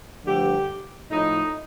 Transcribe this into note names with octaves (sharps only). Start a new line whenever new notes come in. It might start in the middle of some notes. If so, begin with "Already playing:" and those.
G2 D3 F3 A3 G4
A2 F3 A3 D#4